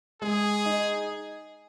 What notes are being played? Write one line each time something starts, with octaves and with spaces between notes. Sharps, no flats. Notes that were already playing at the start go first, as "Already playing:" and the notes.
G#3 G#4
D#4